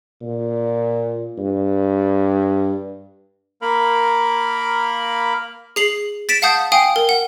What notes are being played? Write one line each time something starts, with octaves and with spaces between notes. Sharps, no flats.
A#2
G2
A#3 A#4 F5 B5
G#4 C7 F#7
A6 B6 D7 E7
F5 F#5 A5 D#6 G6
F5 G5 G#5 D#6
A#4
F#5